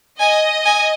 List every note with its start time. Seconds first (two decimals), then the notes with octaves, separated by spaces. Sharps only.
0.19 D#5 G#5
0.65 G#5